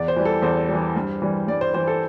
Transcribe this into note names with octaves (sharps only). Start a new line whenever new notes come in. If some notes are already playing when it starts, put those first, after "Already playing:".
Already playing: E2 D5
C5
E3 G3
A4
E2 C5
E3 G3
G2
E3 G3
G2 D5
C5
E3 G3 C5
A4